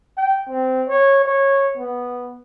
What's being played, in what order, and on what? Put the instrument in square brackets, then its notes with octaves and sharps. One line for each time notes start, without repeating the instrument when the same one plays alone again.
[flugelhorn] G5
C4
C#5
C#5
B3